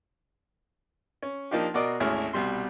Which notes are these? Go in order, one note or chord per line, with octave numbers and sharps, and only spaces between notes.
C#4
F3 A#3 D4 D#4 F4 G4
B2 F#4 A#4 D5 D#5
G#1 D2 C#4 E4 G#4 F6
C2 B2 G3 C6